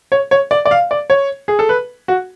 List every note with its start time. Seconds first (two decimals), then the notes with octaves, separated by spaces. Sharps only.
0.12 C#5
0.31 C#5
0.51 D5
0.66 D5
0.71 F5
0.91 D5
1.10 C#5
1.48 G#4
1.59 A4
1.69 B4
2.08 F#4